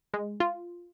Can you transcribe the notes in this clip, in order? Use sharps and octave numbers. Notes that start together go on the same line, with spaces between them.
G#3
F4